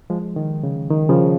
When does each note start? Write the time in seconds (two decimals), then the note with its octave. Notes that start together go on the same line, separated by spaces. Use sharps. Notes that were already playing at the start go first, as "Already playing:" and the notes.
0.10 F3 G#3
0.36 D#3
0.63 C#3
0.90 D#3
1.09 C#3 F3